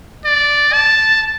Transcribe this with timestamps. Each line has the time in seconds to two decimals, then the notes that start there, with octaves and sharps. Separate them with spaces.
0.25 D5
0.73 A5